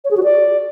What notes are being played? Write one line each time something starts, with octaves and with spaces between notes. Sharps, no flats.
C#5
G#4
F#4
D5